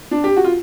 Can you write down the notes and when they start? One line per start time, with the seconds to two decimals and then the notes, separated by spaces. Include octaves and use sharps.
0.11 D4
0.24 G4
0.37 F#4
0.44 F4